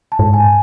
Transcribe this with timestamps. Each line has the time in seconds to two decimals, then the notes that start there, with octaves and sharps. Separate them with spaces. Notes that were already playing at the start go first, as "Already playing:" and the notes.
0.12 A5
0.19 G#2
0.33 G#5